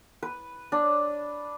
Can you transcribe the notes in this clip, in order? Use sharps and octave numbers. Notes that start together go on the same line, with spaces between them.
B4
D4